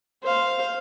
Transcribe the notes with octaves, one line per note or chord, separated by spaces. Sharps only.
C5 F5